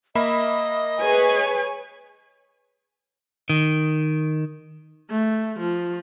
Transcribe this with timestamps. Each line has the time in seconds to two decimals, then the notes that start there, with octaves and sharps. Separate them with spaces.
0.15 A#3 D#5 E5 B5
1.02 G#4 B4 C#5 G#5
3.50 D#3
5.10 A3
5.59 F3